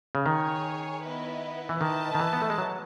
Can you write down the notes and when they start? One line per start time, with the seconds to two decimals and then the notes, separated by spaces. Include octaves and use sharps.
0.15 C#3
0.26 D#3 G#4 C#5 G#5
1.03 B3 E4 B4 D#5
1.69 E3
1.81 D#3 E4 B4 D#5 A5
2.15 D#3
2.20 E3
2.33 B3
2.42 A3
2.50 G#3
2.58 F#3